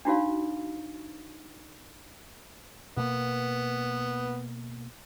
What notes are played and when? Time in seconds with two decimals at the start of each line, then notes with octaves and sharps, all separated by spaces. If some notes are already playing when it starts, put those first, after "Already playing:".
0.05 D4 D#4 F4 F#4 C#5 F5
2.97 B2 A#3 B3